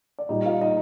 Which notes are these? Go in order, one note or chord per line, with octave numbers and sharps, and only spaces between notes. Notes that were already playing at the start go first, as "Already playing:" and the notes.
D5
A#2 G3 D#4 D#5
F4 F5
D#4 D#5